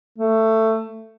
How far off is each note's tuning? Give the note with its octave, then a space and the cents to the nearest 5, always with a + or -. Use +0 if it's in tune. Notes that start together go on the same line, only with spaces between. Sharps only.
A3 +15